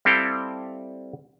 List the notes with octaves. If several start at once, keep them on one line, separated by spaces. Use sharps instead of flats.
G3 C4 E4 A4 F5 G5